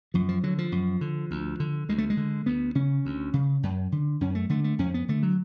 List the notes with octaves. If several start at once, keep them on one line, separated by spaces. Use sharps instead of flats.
F#2 F3
F3
D3 F#3
F3
F#2
D3
D2
D3
D2 G#3
A3
G#3
D3
D2 B3
C#3 C#4
D2
C#3
F#2
D3
F#2 C#4
A3
D3 A3
A3
F2 C#4
B3
D3 A3
F#3